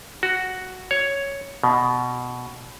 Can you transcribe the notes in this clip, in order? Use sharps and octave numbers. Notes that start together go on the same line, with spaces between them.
F#4
C#5
B2